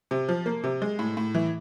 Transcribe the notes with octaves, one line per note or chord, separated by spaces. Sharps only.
C3
F3
A#3
C3
G#3
A2
A2
E3